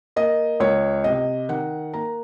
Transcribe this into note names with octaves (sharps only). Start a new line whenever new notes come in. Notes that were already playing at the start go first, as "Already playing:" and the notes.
A#3 D#5
C#2 C#5
C3 D#5
D#3 F#5
A#3 A#5